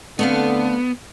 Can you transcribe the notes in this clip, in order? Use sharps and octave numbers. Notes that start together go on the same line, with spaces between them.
D3 A3 B3 C4 F5